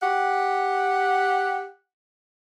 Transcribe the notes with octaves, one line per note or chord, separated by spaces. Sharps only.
G4 F#5